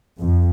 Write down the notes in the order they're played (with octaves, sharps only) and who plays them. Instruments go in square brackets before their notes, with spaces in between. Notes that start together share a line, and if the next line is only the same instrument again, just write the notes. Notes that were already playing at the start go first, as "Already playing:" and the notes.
[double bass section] F2